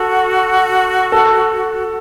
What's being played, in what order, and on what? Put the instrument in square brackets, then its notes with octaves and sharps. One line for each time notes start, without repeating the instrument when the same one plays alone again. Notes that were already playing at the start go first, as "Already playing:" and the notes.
Already playing: [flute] F#4 [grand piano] A4
[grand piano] A4